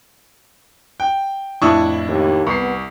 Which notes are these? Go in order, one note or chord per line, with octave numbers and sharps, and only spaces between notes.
G5
F2 A2 D4 E4 E5 C#6 D#6 E6
D#2
C2 B3 C#6 C7